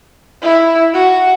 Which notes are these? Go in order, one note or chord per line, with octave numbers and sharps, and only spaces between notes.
E4
F#4